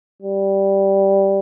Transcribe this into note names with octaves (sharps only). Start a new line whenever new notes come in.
G3